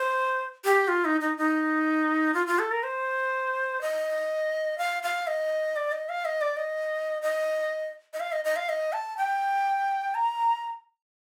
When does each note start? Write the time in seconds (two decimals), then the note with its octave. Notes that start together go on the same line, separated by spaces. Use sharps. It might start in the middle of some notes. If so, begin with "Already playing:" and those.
Already playing: C5
0.65 G4
0.88 F4
1.05 D#4
1.21 D#4
1.38 D#4
2.34 F4
2.47 F4
2.59 A4
2.71 A#4
2.83 C5
3.81 D#5
4.78 F5
5.03 F5
5.27 D#5
5.76 D5
5.92 D#5
6.09 F5
6.25 D#5
6.41 D5
6.57 D#5
7.22 D#5
8.13 D#5
8.20 F5
8.32 D#5
8.45 D#5
8.56 F5
8.69 D#5
8.93 A5
9.17 G5
10.15 A#5